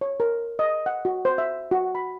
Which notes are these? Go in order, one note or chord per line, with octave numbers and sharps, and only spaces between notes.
C#5
A#4
D#5
F#5
F#4
C5
E5
F#4
B5